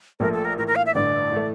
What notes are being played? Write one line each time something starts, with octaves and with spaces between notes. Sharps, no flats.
A#1 A#2 F3 A3 A#4
A4
A#4
A2 E3 A#3 A#4
A#4
F5
E5
A1 G2 D3 D5
A2 E3 A3